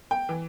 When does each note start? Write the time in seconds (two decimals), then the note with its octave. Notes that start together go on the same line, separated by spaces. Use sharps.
0.11 G5
0.29 E3